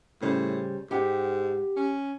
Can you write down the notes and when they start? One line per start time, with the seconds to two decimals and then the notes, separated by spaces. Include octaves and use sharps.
0.22 A2 C#3 G3 C5
0.91 G#2 G4 F#5 G5
1.76 C#4